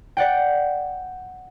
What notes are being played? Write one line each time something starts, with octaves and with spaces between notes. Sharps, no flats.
D5 F#5 G5